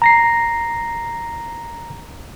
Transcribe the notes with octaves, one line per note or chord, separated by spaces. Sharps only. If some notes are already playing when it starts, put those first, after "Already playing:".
A#5 A#6 C7